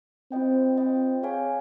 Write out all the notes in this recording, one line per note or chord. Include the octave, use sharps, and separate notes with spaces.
C4 F4 C5 D#5 G5
F4 C5 D#5 G5
G#4 C#5 F5 G#5